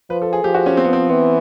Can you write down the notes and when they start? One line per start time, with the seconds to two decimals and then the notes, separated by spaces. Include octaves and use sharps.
0.10 F3 B4
0.22 A4
0.33 G#4
0.44 F3 G4
0.54 F#4
0.66 C#4
0.77 C4
0.84 B3
0.93 C4
1.10 E3 B3